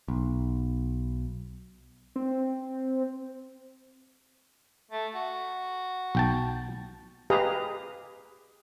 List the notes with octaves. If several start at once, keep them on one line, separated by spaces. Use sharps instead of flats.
B1
C4
A3
F#4
B1 G5 A5
G4 G#4 B4 D#5 F5 A#5